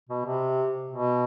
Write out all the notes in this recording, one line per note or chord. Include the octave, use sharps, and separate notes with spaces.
B2
C3
B2